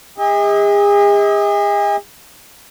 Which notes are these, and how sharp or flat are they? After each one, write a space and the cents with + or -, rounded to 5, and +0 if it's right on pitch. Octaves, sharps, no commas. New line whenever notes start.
G#4 -40 D#5 +40